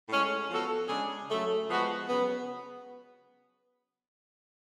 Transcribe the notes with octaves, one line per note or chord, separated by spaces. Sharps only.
A2 G#3 C#4
F3 B3 F#4 A4
C#3 G#3 D4 G#4
C#3 F#3 A3
F3 G#3 B3 F#4
C#3 F#3 B3